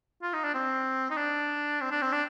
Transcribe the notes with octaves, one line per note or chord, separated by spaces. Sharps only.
F4
D#4
D4
C4
D#4
D4
C4
D4
C4
D4